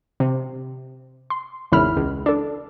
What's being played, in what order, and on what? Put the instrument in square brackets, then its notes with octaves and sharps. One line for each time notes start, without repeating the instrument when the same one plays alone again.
[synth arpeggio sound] C3
C6
G#1 E2 C#3 E4 B5 F6
C#2
D4 A4